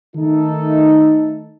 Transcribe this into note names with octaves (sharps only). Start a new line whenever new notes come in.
D#3 A3 D#4 A4